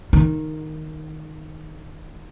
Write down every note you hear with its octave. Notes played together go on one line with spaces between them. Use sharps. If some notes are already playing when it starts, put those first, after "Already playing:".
D#3